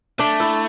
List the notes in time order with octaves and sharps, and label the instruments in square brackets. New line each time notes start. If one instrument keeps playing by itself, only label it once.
[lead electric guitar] A3 [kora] D4
[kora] E4